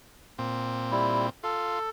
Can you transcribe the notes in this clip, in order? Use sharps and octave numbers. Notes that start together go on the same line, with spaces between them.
A#2 C4
G3 E4
F4 A4